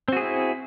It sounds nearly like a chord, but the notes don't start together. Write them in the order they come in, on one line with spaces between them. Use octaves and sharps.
C4 F#4 G#4 E4